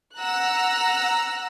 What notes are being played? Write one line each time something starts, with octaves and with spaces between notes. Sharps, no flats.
F#5 A#5 E6 F#6